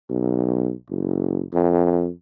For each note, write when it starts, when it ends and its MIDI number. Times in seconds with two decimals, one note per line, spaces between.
0.10 0.72 35
0.90 1.43 30
1.53 2.09 41